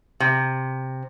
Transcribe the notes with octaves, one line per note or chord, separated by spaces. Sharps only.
C3